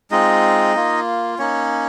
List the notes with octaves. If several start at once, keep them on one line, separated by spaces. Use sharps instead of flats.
G#3 C4 D#4 F4 D#5
A#3 F4
A#3 C#4 D#4 C#5